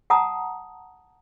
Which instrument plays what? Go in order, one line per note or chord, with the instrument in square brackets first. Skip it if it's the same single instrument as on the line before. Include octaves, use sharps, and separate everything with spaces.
[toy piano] F#5 A5 A#5 D#6